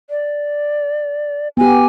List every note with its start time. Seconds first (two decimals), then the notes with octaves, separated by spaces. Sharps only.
0.10 D5
1.57 B3 G4 G#5